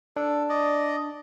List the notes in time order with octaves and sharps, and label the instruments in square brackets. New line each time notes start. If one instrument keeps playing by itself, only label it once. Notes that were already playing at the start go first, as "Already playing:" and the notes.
[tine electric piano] D4 [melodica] A4
[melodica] D5 D#5